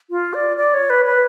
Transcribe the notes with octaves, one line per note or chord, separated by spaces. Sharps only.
F4
D5
D5
C#5
B4
B4